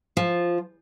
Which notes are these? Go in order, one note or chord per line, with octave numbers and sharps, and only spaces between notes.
F3